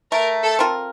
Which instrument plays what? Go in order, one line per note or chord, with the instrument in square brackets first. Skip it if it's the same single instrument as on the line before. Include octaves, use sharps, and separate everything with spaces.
[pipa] A3 [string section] A#4
[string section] A4
[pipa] C4 F4 A#4